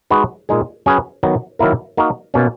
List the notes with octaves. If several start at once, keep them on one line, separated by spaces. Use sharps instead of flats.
G#3 D#4 F#4 B4
A#2 G#3 D#4 G#4
F#3 C#4 G#4 B4
D#3 F#3 B3
D#3 F#3 A#3 E4 A#4
A#3 D#4 F#4 A#4
B2 A#3 C#4